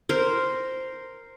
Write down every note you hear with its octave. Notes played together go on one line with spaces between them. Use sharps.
A#4 C5